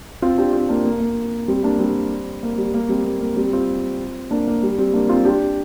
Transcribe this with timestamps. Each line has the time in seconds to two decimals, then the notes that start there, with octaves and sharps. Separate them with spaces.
0.22 C4 F4
0.38 D4 G4
0.53 C4 F4
0.69 A#3 D4
0.85 A#3
1.00 A#3
1.48 G3 C4
1.63 A#3 D4
1.79 G3 C4
2.43 A#3
2.58 G3
2.74 A#3
2.89 G3 C4
3.05 A#3
3.21 A#3
3.36 G3 C4
3.53 C4 F4
4.31 A#3 D4
4.47 A#3
4.63 G3
4.78 G3 C4
4.93 A#3 D4
5.09 C4 F4
5.25 D4 G4